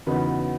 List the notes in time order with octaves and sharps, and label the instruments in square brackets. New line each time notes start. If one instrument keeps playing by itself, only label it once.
[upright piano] E2 C#3 F#3 B3 D#4 B4